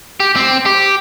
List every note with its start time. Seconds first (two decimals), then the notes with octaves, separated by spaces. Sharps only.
0.20 G4
0.36 C4
0.66 G4